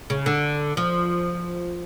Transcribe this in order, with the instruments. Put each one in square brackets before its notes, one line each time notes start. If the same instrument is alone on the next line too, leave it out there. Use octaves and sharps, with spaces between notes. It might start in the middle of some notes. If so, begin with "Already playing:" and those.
[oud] C#3
D3
F3